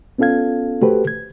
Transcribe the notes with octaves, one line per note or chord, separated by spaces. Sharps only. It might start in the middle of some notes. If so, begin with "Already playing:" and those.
B3 C#4 F4 A4 F5 G#6
A3 F#4 G4 A4 B4 C5
G#6